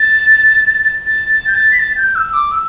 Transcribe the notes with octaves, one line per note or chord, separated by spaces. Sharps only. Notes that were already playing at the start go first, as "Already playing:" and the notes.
Already playing: A6
A6
A6
G6
A6
B6
A6
A6
G6
E6
D6
E6